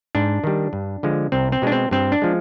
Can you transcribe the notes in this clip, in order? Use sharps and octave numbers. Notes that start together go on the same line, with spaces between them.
G#2 D4
D#3 G3
G2
D3 F3 G#3
C2 C4
C4
B2 G#3 D4
C4
G2 C4
D4
F3 G#3